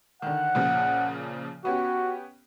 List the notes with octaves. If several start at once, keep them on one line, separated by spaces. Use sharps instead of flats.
D3 D#3 F#5
A#2 C#3 F3
B3 C#4 F#4 G4